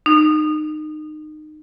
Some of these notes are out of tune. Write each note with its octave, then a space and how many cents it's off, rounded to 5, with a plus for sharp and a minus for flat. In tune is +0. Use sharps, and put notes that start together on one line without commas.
D#4 -25